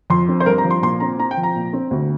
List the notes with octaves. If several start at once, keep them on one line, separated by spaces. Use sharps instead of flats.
F2 C6
C4
C5
G2 A#4
A#5
F3
C6
A#2 C6
C4 A#5
C4 A#5
G5
F3
A#5
A#2
C4
D2